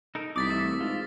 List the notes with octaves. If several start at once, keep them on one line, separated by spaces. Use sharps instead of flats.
D#4 A4 A#4
C2 D6 D#6 A6 B6
E3 A3 E5
G#2 F4